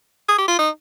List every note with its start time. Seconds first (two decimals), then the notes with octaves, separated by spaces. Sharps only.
0.29 G#4
0.39 G4
0.48 F4
0.59 D#4